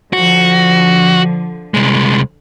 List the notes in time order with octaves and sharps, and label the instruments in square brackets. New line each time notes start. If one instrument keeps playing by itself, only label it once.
[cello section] D3 F3 [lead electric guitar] F#4
[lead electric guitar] C2 G#3